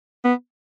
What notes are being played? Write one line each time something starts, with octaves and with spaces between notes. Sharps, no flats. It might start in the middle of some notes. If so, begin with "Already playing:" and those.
B3